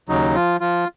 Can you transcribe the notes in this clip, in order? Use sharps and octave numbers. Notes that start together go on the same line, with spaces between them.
D#2 C#3 F#3 D#4
F3 F4
F3 F4